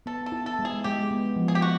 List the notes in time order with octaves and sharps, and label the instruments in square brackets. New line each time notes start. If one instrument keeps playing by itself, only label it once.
[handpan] B3 [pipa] A4
[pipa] A4
[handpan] E4
[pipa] A4
[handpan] G#3
[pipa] G#4
[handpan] G#3 [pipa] G4
[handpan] B3
F3
[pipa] G#4
G4
F#4